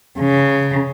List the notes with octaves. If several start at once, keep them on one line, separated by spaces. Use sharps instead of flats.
C#3